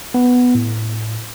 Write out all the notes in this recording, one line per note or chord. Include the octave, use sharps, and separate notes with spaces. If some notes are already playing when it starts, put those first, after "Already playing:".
B3
A2